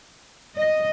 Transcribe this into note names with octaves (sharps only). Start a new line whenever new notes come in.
D#5